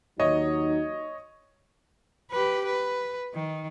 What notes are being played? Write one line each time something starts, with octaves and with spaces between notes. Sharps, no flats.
D#2 F#3 D#4 C#5 D#5
G4 B4
B4
D#3